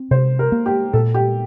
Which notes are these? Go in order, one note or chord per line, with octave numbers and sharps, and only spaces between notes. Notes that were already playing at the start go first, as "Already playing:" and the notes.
Already playing: C4
C3 C5
A#4
A#3
G4
A#2 A4
G4